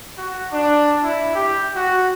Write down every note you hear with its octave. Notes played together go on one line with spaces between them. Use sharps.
F#4
D4
E4
G4
F#4